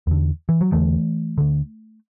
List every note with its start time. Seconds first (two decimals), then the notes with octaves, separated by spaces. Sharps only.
0.07 E2 D3
0.49 E3
0.61 F#3
0.72 E2 D3 E3 A3
1.38 D2 D3